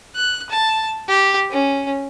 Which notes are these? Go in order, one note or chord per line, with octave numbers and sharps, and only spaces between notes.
F#6
A5
G4
C#4